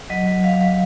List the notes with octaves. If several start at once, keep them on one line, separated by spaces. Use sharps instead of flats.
F#3 D#5
F#3
F#3 F5
F#3